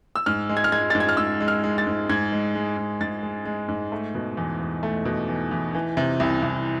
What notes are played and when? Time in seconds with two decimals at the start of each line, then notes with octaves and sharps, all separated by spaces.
0.16 E6
0.26 G#2 F6
0.49 G#3
0.57 G#6
0.64 F6
0.72 G#3 G#6
0.90 A6
0.95 G#2
1.00 G#6
1.09 F6
1.17 G#2 E6
1.41 G#3
1.48 F6
1.64 G#3
1.78 A6
1.87 G#2
2.09 G#2 G#6
2.32 G#3
2.55 G#3
2.77 G#2
3.01 G#2 A6
3.23 G#3
3.45 G#3
3.68 G#2
3.92 A3
4.15 B2
4.37 E2
4.60 E2
4.83 A3
5.05 B2
5.29 E2
5.51 E2
5.75 E3
5.97 C3
6.20 C2
6.42 C2